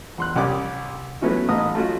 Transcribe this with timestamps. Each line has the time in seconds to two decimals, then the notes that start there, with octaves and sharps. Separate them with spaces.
0.18 E2 C6 F#6
0.36 C2 C#4 G4 D5 D6 D#6
1.21 F#3 A3 B3 C#4 E4 F#4
1.49 A1 A2 D#4 D#5 D#6
1.75 A3 C#4 F4 F#4